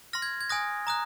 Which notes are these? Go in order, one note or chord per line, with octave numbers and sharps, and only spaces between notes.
C6 F6 A#6
G#6
G#6
G#5 D#6 F#6 A#6
A#5 D#6 F#6